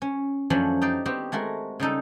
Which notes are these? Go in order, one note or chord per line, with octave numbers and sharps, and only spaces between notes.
C#4
F#2 F3 F#3 A3 C#4 D4
D#4 G4 D5 F5
B3 C4 F#4 G4
G#3 A3 F#4 A#4
C#3 G3 D#4 A4